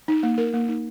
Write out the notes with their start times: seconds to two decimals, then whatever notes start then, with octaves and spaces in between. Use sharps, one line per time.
0.08 D#4
0.23 A#3
0.38 A#4
0.54 A#3
0.69 D#4